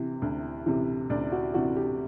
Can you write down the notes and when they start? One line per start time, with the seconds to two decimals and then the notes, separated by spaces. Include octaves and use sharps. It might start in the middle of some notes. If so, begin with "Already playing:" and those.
Already playing: C3 E3
0.22 D2
0.66 C3 E3
1.10 D2 D5
1.32 F#4
1.54 C3 E3 F#4
1.76 G4